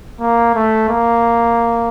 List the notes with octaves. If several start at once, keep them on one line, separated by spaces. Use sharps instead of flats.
A#3
A3
A#3